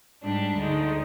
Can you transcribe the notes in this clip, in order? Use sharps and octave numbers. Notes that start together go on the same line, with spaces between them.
G#2 G3 D4
D2 D3 G#3 D#4